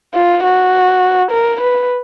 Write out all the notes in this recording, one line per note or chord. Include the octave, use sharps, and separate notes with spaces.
F4
F#4
A#4
B4